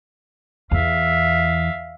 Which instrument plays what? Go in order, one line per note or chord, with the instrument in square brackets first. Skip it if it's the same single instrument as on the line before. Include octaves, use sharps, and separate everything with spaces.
[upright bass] E2 [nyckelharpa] E5 F5